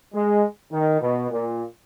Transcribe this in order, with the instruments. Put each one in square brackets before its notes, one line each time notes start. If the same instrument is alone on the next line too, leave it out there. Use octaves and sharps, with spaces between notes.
[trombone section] G#3
D#3
B2
A#2